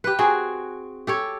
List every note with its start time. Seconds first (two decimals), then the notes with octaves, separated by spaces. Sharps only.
0.04 G4 B4
0.19 C4 F#4 G#4 G#5
1.07 G4 A4 C#5